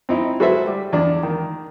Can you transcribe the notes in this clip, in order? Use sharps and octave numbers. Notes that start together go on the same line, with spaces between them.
C4 D#4 E4
F#4 G#4 A4 B4 C5 E5
G3
E2 D4
D#3